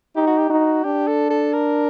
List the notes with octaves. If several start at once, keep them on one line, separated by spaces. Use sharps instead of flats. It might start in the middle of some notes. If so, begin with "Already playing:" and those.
D#4 G4
F#4
G4
D#4 F#4
D4 G4
A4
A4
A#4